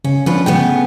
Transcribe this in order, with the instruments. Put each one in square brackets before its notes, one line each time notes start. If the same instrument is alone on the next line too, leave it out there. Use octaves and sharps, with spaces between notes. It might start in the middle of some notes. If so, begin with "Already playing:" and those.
[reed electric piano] C#3 [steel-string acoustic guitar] C#4
[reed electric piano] D3 F3 [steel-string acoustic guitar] C#4 D4 B4
[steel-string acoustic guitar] C#3 A3 B3 [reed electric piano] G5